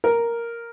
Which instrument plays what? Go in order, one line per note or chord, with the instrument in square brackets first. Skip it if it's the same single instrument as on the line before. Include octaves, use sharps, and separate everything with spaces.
[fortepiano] A#4